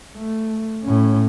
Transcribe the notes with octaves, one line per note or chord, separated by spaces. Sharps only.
A3
A2 C#4